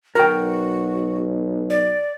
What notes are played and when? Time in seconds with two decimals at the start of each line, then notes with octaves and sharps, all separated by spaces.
0.15 B1 F#4 A#4 G5
1.70 D5